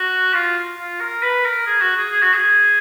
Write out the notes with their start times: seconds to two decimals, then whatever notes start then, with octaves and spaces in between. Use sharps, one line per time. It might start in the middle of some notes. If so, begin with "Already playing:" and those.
Already playing: F#4
0.34 F4
0.78 F4
1.00 A#4
1.23 B4
1.45 A#4
1.66 G#4
1.81 F#4
1.96 G#4
2.11 G#4
2.22 F#4
2.34 G#4